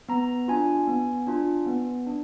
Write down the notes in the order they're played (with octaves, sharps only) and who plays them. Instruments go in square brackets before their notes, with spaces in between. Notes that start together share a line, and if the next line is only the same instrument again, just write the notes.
[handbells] B3 A#5
D4 F4 G#5
B3
D4 F4
B3
D4